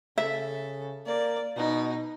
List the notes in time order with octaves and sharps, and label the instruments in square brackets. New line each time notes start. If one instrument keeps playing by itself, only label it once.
[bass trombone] C#3 [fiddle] A4 [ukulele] E5
[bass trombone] A#3 [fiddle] D5
[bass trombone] B2 [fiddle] D#4